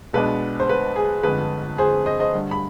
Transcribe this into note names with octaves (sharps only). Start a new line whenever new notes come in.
B1 B2 G#3 B3 D4 B4
C5
B4
G#4
G1 F2 D3 G#3 B4
G#4 C5
C5 D#5
C5 D#5
G2 D3 G3
B5